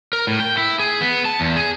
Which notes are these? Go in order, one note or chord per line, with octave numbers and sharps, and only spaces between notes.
A#4
A2
G5
E4
G#4
B3
A5
E2
G#4